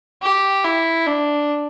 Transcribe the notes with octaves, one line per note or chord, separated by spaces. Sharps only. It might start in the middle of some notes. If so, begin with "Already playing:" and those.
G4
E4
D4